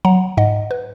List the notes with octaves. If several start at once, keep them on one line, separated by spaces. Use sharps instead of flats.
F#3 F#5 A#5
G#2 D#5 F#5
B4